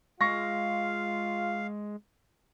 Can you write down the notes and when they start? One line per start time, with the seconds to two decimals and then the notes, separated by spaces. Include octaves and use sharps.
0.21 G#3 F4 F5 C#6 A#6